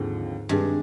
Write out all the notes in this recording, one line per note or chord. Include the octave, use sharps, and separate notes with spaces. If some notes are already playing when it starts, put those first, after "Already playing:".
Already playing: D#2 G#2 D3 F3 C4
G2 C3 D#3 G#3 D4 G#4